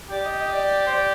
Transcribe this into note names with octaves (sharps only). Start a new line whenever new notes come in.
G4 D5
D#5
D#5
D5
C5
D5